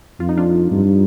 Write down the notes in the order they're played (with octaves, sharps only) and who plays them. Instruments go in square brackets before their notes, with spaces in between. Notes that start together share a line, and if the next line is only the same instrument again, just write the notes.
[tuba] F2 [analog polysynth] F4
[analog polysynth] D#4
D4 F4
[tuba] G2